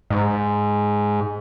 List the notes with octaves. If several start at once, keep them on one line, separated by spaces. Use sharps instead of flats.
G#2